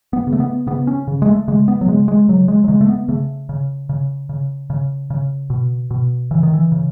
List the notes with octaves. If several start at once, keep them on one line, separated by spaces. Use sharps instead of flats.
B3
C#3
A3
B3
C#3 B3
C#4
C#3
G#3
A3
C#3 G#3
B3
F#3
C#3 G#3
G#3
C#3 F#3
G#3
F#3
C#3 G#3
A3
B3
C#3 A3
C#3
C#3
C#3
C#3
C#3
B2
B2
C#3 E3
D#3
E3
C#3